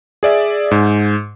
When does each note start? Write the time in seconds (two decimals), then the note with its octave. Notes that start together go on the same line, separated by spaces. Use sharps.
0.23 G#4 D5 E5
0.71 G#2